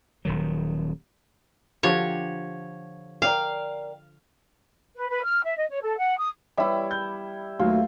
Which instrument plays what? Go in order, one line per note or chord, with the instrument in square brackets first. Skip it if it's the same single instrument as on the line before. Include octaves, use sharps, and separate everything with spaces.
[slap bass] D#1 D#3 F#3
[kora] D3 F3 G4 [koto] C#5
[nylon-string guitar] A#4 D5 G5 [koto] F5
[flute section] B4
B4
F6
E5
D#5
C#5
A4
F#5
D#6
[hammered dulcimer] G3 E4 [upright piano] C#5 E5
[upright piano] G6
[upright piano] D#2 F#3 [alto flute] A3 [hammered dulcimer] F4